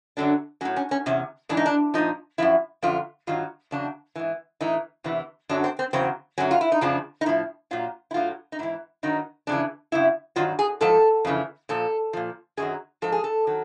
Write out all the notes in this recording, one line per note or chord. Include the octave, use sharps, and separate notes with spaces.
F#2 D3 F#3 D4
A2 F#3 C#4
C#4
C#4
E2 C3 C#4
G#2 E3 D4
D#4
D4
A#2 F3 D#4
F#2 C#3 F3 E4
F#2 D3 F3 F4
G2 D#3 F#3 F4
E2 C#3 F#3 D4
G#2 E3
A2 E3 D#4
E2 C3 E3
F#2 D3 F#3 D4
C4
C4
E2 C#3 F#3 C4
F#2 D3 F#3 C#4
F4
E4
D#4
F2 C#3 F3 D4
D#4
A2 F3 E4
A#2 F#3 F4
E4
A2 F#3 F4
D#4
G#2 E3 E4
G2 D#3 F#3 D#4
F2 C#3 E3 D4
F#2 C#3 E4
G2 D#3 F#3 F4
G#4
G#2 F3 A4
F2 C#3 E3
A#2 F3 A4
A#2 F3
F#2 D#3 F#3 G#4
G#2 F3 A4
G#4
A4
D#3 F#3